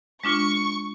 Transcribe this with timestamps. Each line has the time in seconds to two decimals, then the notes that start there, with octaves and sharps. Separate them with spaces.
0.24 G#3 D4 F4 C#6